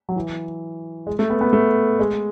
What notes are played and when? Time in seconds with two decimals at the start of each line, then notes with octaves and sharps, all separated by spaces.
0.09 F#3
0.16 E3
1.07 G#3
1.19 A3
1.30 B3
1.41 B3
1.53 A3
2.00 G#3